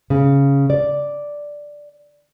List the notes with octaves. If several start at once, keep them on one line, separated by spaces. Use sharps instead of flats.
C#3
D5